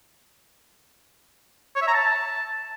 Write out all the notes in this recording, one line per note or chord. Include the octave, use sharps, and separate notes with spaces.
C#5
E5
A#5
A5